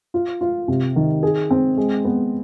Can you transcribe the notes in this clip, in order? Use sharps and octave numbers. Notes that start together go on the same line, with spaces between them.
F4
F4
C3
D#3
G#4
C4
G#3
B3